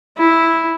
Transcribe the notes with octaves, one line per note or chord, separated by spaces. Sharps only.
E4